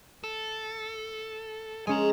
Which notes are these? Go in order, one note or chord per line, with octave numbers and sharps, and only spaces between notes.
A4
G#3 C#4 G#5 A#5